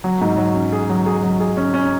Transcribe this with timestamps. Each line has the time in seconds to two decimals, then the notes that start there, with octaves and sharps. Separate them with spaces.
0.04 F#3
0.21 G#2
0.37 F#3
0.54 C#4
0.72 G#4
0.90 F#3
1.06 G#4
1.22 F#3
1.40 G#4
1.57 C#4
1.74 C#4